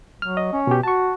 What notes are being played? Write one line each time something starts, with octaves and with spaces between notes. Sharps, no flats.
F#3 F6
D#5
C#4
B2 G4
F#4 A5 C#6